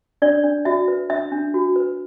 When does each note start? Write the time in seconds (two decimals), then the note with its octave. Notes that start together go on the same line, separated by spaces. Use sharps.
0.22 D4 D5
0.44 D4
0.65 F#4 E5
0.88 B4
1.09 D4 E5
1.32 D4
1.54 F#4
1.76 B4